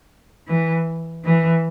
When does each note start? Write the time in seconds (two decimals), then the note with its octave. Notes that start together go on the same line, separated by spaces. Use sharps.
0.47 E3
1.24 E3